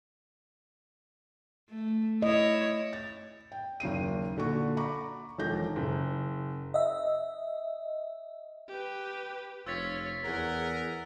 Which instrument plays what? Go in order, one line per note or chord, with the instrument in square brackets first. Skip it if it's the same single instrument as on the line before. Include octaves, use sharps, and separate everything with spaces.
[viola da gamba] A3
[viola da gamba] E4 C#5 [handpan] D#5
[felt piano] A6
G5
F#1 D#2 C7 D#7
A#2 D3 F#4 C#6
A#5 B5 C#6 D6
E1 D#3 F3 A4 G6 A#6
[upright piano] F#1
[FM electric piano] D#5 E5
[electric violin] G4 B4
[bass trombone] F1 [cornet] F4 [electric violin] C#5 [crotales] E6 A6 B6
[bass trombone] E2 [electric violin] G#4 F#5 [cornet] A#4